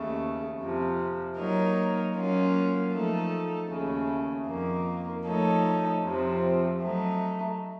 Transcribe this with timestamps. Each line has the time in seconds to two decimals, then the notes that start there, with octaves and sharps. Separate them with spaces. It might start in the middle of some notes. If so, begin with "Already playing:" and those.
Already playing: D#2 C#3 A3
0.60 F2 C3 F3
1.37 F#3 A#3 D#4 A#4 C#5
2.15 F#3 A#3 C#4 F4
2.93 F3 A3 D#4 A4
3.70 D#2 C#3 A3
4.48 F2 D#3 A#3
5.25 F3 A3 D#4 A4 C#5
6.03 F2 C3 F3 C4
6.81 F#3 A3 D#4